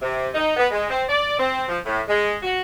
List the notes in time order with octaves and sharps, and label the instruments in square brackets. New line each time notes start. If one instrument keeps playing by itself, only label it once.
[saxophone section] C3
D#4
B3
G#3
C4
D5
C4
F3
A2
G#3
F#4